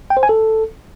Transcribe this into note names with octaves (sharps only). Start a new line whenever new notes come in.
G5
C5
G#5
A4